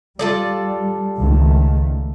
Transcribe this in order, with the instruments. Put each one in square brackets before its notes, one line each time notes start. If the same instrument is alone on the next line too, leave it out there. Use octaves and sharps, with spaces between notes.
[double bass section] G3 [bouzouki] F4 A4 D5
[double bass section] C#2 D#3 A3